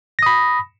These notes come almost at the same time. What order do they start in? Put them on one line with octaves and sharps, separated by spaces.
A#6 D#6 B5